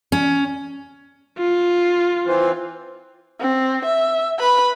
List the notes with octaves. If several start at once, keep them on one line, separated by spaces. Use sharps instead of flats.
C#4
F4
E3 C4
C4
E5
B4 B5